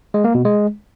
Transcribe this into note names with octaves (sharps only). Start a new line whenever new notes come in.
G#3
A#3
B2
G#3